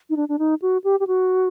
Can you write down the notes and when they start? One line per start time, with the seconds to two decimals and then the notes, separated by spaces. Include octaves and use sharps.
0.10 D#4
0.16 D4
0.29 D4
0.39 D#4
0.62 F#4
0.84 G4
1.00 G4
1.07 F#4